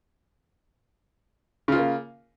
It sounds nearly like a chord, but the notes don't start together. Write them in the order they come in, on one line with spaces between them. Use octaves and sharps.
C#3 F4 A#3